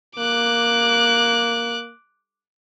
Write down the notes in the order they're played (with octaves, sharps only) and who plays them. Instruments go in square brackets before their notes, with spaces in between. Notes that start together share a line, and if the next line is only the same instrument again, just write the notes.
[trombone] A#3 [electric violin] D6 F#6